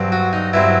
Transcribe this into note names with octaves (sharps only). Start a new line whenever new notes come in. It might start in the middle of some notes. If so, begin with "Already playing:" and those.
Already playing: G2 F#3 C4
F#4
D#4
G2 F#3 C4 E4